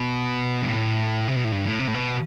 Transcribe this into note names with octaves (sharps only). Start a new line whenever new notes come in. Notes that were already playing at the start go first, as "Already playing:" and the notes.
Already playing: B2
G2
A2
C3
B2
A2
G2
A2
C3
A2
B2